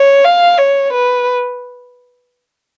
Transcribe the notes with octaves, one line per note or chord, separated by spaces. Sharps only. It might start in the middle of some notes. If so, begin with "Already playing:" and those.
Already playing: C#5
F5
C#5
B4